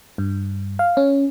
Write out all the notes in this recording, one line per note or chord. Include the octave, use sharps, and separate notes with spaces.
G2
F5
C#4